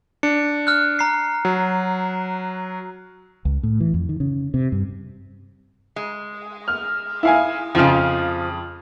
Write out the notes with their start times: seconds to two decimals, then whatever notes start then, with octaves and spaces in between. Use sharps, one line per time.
0.23 D4 C#7
0.67 F6 F#6
0.99 A#5 C7
1.45 F#3
3.45 C#2
3.63 A2
3.80 E3
3.94 F2
4.09 D#3
4.20 C#3
4.54 C3
4.72 G2
5.96 G#3
6.68 F6
7.23 E4 F5 G#5
7.75 F2 C#3 F3 F4 F6